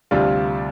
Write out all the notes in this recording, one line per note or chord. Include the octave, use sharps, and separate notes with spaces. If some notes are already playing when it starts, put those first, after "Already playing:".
D2 C3 G3 D4 F4